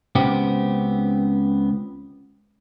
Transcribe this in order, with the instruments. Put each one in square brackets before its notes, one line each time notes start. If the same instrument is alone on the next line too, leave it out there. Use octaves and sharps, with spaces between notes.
[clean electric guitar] C#2 C#3 B3 C4 G4